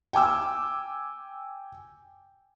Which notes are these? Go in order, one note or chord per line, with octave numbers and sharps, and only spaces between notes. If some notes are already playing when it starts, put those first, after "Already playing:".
G5 G#5 D6 E6